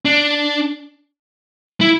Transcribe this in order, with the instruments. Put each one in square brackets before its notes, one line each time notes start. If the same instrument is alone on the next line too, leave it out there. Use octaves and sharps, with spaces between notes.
[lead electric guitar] D4
E4